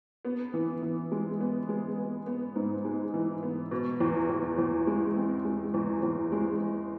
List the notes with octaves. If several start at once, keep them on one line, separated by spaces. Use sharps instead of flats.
B3
E3
E3
G#3
B3
G#3
B3
B3
G#2
G#3
E3
B3
B2
E2
E2
E2
G#3
C4
G#3
E2
E2
G#3